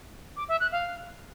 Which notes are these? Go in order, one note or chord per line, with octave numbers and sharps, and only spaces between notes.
D6
E5
F#6
F5